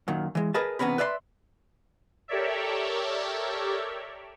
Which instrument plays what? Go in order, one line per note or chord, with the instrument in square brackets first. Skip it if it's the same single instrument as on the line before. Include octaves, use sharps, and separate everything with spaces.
[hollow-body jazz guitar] F#2 A#2 D#3
E3 G#3
G#4 A#4 B4 D#5 A5
E2 C3 B3 C#4 A#5 B5
B4 D5 E5 A5 C6
[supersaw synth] G4 A4 A#4 C#5 D5 E5